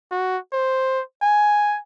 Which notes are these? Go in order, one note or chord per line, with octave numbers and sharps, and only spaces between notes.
F#4
C5
G#5